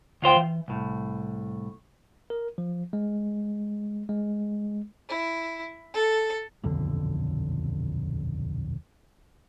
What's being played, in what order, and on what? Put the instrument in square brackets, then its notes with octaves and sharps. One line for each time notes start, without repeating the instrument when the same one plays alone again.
[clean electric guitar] D2 F4 C5 G5
E3
C2 A2
[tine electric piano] A#4
F3
G#3
G#3
[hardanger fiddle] E4
A4
[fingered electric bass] D#1 B1 F2 D3